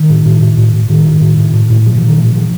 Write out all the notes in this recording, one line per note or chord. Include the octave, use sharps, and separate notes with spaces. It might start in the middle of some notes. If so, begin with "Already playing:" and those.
Already playing: D#3
A2
A2
A2
A2
A2
A2 D#3
A2
A2
A2
A2
A2
A#2 F3
E3
A#2
D#3
A#2 E3
A#2 F3